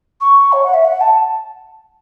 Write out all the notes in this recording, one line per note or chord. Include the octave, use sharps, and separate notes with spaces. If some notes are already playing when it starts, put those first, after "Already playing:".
C#6
C#5
F#5
E5
F#5
A5